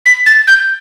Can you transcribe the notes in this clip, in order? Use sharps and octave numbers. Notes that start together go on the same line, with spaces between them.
B6
A6
G6